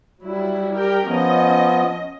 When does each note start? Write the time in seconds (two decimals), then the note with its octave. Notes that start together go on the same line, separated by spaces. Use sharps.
0.22 F#3 G3 E4
0.74 G4 A#4 G5
1.06 F3 B3 C#4 D#5